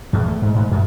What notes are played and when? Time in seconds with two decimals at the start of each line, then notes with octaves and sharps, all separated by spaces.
0.13 E2
0.28 A3
0.42 G#2
0.55 G#2
0.71 F#2